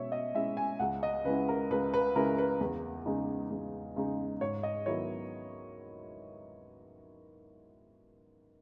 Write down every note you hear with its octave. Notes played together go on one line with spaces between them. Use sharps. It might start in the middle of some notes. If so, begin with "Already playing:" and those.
Already playing: B2 G#3 C#4 C#5 E5
D#5
G#3 C#4 E4 E5
G#5
C#2 F#5
D#5
C#3 G#3 C#4 E4 B4
A#4
C#2 B4
B4
C#3 G#3 C#4 E4 A#4
B4
E2
C#3 G#3 D#4
E2
C#3 G#3 D#4
G#2 C#5
D#5
D#3 F#3 B3 E4 C#5